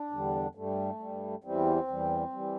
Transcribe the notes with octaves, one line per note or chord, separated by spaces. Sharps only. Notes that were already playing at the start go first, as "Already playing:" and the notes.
Already playing: D4
E2 D3 G3
G2 G3 A3
G2 G3
E2 E3 G3 C4
E2 E3 G3
E3 G3